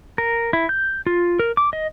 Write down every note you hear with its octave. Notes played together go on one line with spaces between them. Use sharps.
A#4
E4
G6
F4
A#4
D6
D#5